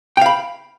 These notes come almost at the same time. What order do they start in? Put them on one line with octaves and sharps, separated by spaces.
G5 F5 B5